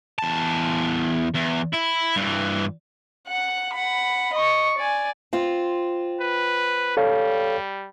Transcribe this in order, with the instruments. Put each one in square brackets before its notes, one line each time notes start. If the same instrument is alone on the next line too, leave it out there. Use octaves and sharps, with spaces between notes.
[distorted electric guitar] E2 A5
E2
E4
G2 E3
[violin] F#5 F#6
F#5 B5
D#5 C#6
D5 G#5
[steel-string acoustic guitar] C4 F4
[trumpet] B4
[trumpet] G3 [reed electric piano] A4 C#5 F5